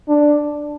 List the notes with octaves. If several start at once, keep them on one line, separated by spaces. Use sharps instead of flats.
D4